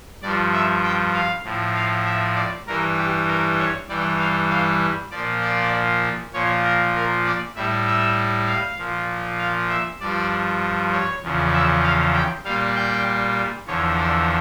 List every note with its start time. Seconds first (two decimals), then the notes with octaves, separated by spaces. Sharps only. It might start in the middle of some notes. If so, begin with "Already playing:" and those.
0.22 G2 F3 D5
0.53 E5
0.83 G5
1.14 F5
1.44 A2 F3
1.76 F5
2.06 E5
2.36 D5
2.67 G2 E3 G3 A#4
2.97 G4
3.28 A#4
3.59 C#5
3.89 G2 E3 G3 D5
4.20 F5
4.50 F5
5.11 A#2 F3 D5
5.42 D5
6.33 A#2 F3 C#5
6.64 A#4
6.95 A#4
7.25 D5
7.56 A2 G3 E5
7.86 E5
8.48 F5
8.78 A#2 F3
9.39 F5
9.70 E5
10.00 G2 F3 D5
10.92 C#5
11.23 E2 C#3 F3
11.53 E5
11.84 F5
12.14 G5
12.45 A#2 G3 F5
12.75 G5
13.67 E2 D3 F3 C#5
13.98 D5